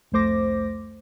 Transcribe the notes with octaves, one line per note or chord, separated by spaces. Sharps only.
C2 F2 A3 C5 D6 A#6